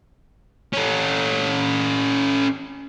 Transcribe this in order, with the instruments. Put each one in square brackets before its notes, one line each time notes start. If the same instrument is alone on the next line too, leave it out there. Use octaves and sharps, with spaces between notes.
[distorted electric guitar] C#4 A4